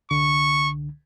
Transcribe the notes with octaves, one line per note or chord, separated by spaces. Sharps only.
C2 D3 C#6